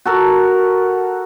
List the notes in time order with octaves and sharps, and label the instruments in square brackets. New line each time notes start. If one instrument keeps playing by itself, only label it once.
[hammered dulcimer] F#4 A4 A#4